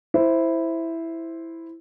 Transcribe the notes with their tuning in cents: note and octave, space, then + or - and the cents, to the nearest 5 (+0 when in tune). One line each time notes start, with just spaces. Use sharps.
E4 +0 C5 +0